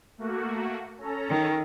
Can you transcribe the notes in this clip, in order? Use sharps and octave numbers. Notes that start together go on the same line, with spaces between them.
A3 A#3 F#4
C#4 A4 A#5
D#3